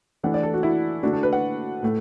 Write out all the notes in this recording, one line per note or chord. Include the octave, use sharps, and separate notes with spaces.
E3 A3 D4 F#5
D5
A4
F#4
E4
D3 A3 D4 F#4
A4
B4
F#5
A2 A3